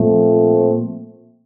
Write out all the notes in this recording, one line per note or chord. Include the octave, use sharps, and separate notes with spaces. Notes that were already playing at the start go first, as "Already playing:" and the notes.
Already playing: A#2 F3 A3 C4